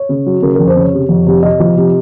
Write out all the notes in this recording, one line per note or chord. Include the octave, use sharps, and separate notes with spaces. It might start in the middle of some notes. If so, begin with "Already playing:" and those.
Already playing: C#5
C#3
F#3
C#3 A#4
F2 A#4
C5
C#3 C#5
C3
F2
C3
C3 D#5
F3
C3